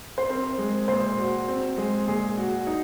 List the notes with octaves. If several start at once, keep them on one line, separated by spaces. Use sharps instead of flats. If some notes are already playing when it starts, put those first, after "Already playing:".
C5
C4 A#4
G#3
A#2 C5
F#4
C4
G#3
A#2 G#4
F#4
D#4